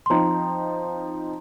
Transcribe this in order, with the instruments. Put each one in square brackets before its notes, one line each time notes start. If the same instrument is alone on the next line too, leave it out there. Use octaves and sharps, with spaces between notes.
[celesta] C6
[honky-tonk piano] F3 C4 D#4 [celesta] A#5